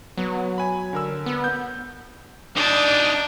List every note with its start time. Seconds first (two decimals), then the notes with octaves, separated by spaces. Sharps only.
0.17 F#3 B3
0.58 G#5 B5
0.93 D3 A#4 E6
1.26 B3
1.44 G6
2.56 D4 D#4 D5